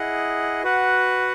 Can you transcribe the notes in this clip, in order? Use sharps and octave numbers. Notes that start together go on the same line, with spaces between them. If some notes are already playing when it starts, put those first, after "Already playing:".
Already playing: E4 G#4 D#5 F#5
F#4 B4 F#5